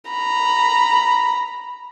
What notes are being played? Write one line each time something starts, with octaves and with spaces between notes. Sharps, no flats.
A#5 B5